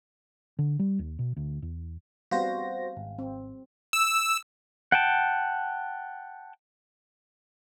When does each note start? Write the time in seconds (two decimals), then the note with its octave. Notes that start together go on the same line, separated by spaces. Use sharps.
0.59 D3
0.79 G3
0.99 D#2
1.19 B2
1.37 D2
1.62 E2
2.31 G3 B3 C4 F#4 C5 F5 A#6
2.97 G#1
3.19 C4
3.93 E6
4.92 F#5 G5 A5